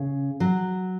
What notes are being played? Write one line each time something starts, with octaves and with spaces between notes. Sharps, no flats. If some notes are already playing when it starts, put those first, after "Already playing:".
Already playing: C#3
F#3